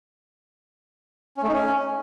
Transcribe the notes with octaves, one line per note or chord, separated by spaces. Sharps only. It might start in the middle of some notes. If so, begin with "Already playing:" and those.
C#4
A3
D#4
C#4